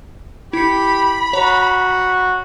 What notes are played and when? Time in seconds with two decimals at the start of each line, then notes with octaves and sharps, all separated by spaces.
0.53 E4 G4 B5 C#7
1.33 F#4 C#5 A#5